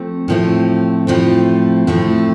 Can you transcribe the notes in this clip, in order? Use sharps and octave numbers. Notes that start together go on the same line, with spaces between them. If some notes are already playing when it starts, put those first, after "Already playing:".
Already playing: F3 A3 C4
A2 F3 A3 C4
A2 F3 A3 C4
A2 F3 A3 C4